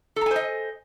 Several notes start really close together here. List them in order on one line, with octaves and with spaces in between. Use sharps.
A4 A#5 G#5 C5 D#5